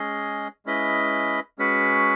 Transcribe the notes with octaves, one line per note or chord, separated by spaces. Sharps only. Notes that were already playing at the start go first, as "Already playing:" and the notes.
Already playing: G#3 C#4 G#4 D#5
G#3 C#4 E4 B4 D#5
G#3 C#4 F#4 B4